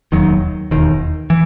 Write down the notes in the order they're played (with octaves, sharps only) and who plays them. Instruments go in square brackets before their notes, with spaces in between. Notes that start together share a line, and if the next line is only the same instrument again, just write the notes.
[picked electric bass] E1 D#2 D#3 F#3
E1 D#2 D#3
E3